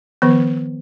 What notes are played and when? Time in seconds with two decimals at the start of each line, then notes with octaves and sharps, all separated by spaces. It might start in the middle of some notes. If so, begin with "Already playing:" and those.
0.22 D#3 F3 B3